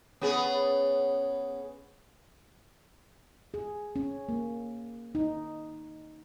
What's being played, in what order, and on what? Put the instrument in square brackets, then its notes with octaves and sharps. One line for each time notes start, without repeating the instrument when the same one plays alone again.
[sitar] B3 C#4 G#4
[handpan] G#4
C#4
A#3
D#4